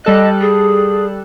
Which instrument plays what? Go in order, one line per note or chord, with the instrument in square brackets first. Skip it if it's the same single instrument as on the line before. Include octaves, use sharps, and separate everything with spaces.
[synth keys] G3 A4 F#6 [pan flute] D#5
[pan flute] G#4